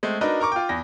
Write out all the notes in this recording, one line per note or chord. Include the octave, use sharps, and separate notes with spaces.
G#3 A3 C4
D4 D#4 F#4 A#4 B4 D#5
A#4 A#5 C#6 D6
F4 G5
E2 A#6